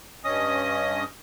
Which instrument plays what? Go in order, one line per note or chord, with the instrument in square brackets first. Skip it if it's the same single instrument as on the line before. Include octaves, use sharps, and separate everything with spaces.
[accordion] G2 C#4 D#5 D#6